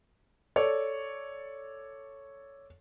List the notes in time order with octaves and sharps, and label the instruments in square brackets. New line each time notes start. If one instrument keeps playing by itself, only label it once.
[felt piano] A4 C#5 D5